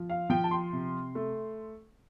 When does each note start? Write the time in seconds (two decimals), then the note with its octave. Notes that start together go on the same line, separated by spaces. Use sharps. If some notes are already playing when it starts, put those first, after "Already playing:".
Already playing: F3
0.10 F5
0.30 F3 G5
0.44 A5
0.51 C6
0.72 C3
1.15 A3